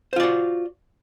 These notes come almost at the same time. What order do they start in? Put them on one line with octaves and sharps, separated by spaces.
C5 F4 D5 F#4